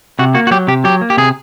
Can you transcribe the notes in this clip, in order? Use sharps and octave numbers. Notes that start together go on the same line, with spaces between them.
C3 F#4
A#3 F#4
F#4
F#3 G4
C3 G4
F#3 G4
A#3
G4
C3 G#4